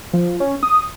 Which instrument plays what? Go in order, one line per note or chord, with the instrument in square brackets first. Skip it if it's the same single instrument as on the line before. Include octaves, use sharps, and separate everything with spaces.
[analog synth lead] F3
C#4
D#6